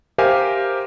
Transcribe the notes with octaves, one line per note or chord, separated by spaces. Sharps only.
G4 A#4 C5 E5 F5 G#5